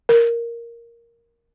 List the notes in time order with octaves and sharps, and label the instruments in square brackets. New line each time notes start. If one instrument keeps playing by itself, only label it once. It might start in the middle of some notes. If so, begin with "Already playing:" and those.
[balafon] A#4